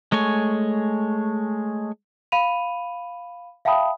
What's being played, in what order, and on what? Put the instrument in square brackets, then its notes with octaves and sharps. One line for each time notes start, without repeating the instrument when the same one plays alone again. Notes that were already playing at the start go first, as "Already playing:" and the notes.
[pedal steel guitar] G#3 A3 C#5 G#5
[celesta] F5 B5 D#7 F7
E5 F5 G5 A5 B5 D#6